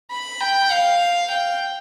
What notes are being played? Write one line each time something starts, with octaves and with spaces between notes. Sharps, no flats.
B5
G5
F5
G5